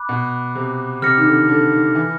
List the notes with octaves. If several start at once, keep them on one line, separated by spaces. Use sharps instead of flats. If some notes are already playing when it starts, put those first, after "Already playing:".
Already playing: B5 D6 F#6
B2
C3
C3 F6 A#6 C#7
D#3
D3
D3
D#3
E3